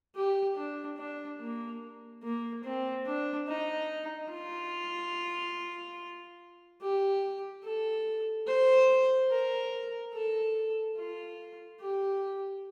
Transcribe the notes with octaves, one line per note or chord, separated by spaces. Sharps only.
G4
D4
D4
A#3
A#3
C4
D4
D#4
F4
G4
A4
C5
A#4
A4
F4
G4